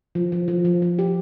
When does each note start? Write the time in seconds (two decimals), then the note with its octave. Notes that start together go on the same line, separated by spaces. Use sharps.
0.15 F3
0.32 F3
0.48 F3
0.65 F3
0.82 F3
0.99 G4